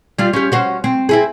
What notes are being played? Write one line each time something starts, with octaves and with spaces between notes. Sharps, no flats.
G3 F4
C#4 G4
C#4 F#4 C5
C4
C4 E4 G#4